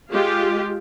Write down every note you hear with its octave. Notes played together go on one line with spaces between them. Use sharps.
G#3 F4 G4